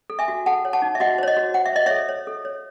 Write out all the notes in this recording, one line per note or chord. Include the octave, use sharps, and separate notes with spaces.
A4
E5 G#5
F#4
A4 F#5 A5
C#5
F#5 A5
D#4
E5
F#4 D#5 F#5
C5 C#5
D#5
F#4
C5 F#5
E5
C5 D#5
A4 C#5 E5
C#5
A4
C#5